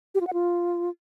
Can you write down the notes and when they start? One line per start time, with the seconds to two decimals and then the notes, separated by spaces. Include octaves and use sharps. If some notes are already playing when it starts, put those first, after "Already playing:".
0.15 G4
0.21 F4
0.27 F#5
0.33 F4